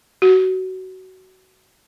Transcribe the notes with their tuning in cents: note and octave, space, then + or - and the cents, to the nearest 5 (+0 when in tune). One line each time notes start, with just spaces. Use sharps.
F#4 +20